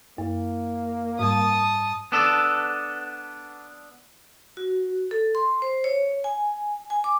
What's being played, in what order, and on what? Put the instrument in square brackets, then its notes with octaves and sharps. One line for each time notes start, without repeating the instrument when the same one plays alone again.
[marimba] F#2 [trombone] A#3
[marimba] G#2 G3 [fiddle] A5 D#6
[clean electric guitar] B3 D4 A4
[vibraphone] F#4
A4
C6
C5
C#5
G#5
G#5
D6